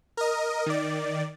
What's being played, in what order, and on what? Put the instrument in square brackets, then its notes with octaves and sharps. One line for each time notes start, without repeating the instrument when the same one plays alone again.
[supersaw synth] A#4 D#5
D#3 D5